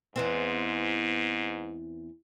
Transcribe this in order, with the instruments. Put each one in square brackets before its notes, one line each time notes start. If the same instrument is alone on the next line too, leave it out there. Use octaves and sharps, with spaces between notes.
[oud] E2 B3 C4 [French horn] G#2